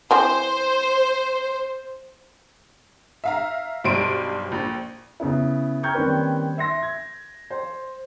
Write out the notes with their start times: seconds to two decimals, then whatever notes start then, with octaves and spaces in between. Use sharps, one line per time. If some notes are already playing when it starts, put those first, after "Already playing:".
0.11 E3 C4 C5
3.24 E5 F5 A#5
3.84 B1 G2 G3 C5 D7 D#7
4.52 A#1
5.20 C#3 B3 E4
5.83 G5 A#5 C#6 F6 G6 G#6
5.95 D#3 G3 A#3 C4 C#4 B4
6.58 E5 C6 A#6
6.83 G#6
7.50 C5